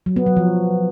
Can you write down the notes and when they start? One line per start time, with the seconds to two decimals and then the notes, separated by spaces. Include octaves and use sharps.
0.06 F#3
0.16 B3
0.26 F#3
0.37 F3